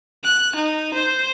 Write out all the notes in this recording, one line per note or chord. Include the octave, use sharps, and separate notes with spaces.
F#6
D#4
C5